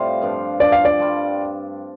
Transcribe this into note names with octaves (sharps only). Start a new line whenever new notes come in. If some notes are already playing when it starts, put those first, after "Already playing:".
Already playing: A2 C3 G3 C4 F4 A4 F5
G2 F3 D4
G2 F3 D4 D5
F5
D5
G3 F4 A4